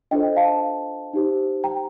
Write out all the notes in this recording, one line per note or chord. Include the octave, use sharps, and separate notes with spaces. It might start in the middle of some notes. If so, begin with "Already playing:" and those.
D4 F4 A4 C5 D#5 G5
F5 A5
D#4 G4 C5
G5 A#5